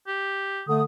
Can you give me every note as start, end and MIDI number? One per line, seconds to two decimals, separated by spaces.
0.07 0.63 67
0.68 0.82 50
0.68 0.82 57
0.68 0.82 87